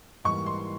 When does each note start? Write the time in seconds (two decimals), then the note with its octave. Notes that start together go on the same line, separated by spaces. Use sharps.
0.24 G#2 E3 G3 A#3 C#6
0.46 C6